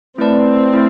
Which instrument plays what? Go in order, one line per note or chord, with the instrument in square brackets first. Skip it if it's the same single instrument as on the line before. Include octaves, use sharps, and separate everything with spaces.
[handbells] A3 E4 B4 D5 A5 [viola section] C4
[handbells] A3 E4